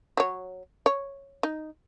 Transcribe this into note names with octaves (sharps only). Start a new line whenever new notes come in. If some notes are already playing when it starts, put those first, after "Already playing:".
F#3 C#5
C#5
D#4